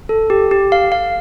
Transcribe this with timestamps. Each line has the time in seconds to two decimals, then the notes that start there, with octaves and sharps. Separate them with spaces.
0.09 A4
0.30 G4
0.51 G4
0.72 F5
0.92 F5